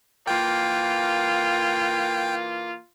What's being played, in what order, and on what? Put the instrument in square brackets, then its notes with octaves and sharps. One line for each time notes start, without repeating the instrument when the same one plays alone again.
[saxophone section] E3 A#3 [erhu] F4 [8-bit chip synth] G5